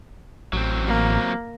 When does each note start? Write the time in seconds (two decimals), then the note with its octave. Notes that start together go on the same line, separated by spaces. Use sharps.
0.53 A1 F#3 C4
0.88 A#3